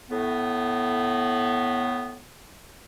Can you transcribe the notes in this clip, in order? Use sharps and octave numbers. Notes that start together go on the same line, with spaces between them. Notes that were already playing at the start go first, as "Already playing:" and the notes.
A2 B3